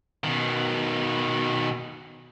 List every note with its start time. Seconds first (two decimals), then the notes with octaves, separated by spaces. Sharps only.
0.24 B2 D#3